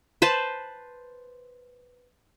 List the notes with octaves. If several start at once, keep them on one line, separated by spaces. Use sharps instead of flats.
B4 C5 A5